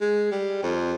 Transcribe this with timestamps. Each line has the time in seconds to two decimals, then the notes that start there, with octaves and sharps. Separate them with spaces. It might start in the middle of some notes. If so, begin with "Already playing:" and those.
0.01 G#3
0.31 G3
0.62 F2